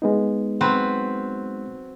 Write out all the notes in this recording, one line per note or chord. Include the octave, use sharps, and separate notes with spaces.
G#3 B3 D#4
F#3 C4 B4